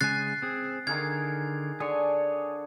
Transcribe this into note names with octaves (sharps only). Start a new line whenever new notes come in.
C#3 G#3 G#5 F#6 A6 C7
C4 G#4
D3 D#3 G#4 F5 G#6
D3 G#4 C#5 G#5